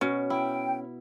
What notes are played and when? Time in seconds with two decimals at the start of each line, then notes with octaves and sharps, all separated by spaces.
0.01 B2 C#4
0.30 E4 G5